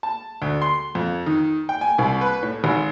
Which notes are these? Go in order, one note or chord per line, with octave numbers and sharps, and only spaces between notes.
A5
D2
C6
F2
D#3
G5
G#5
C2
B4
A2
G#1